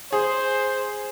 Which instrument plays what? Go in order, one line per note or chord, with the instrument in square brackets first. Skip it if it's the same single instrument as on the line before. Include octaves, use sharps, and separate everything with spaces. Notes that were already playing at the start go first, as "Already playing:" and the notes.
[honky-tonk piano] G#4 [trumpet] C5